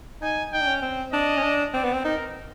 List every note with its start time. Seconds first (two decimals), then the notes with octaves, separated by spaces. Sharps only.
0.22 D#4 G#5
0.53 D#4 G5
0.61 D4
0.67 C#4
0.82 C4
1.13 D4 D#5
1.37 C#4
1.43 D4
1.74 C4 D5
1.84 B3
1.93 C4
2.04 D#4 A#4